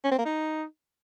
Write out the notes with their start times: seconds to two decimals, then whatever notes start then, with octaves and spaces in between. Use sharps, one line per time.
0.04 C#4
0.11 C4
0.18 A#3
0.26 D#4